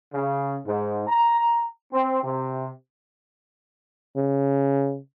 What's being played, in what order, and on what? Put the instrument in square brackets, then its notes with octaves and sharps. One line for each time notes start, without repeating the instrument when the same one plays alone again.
[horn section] C#3
G#2
A#5
C4
C3
[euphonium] C#3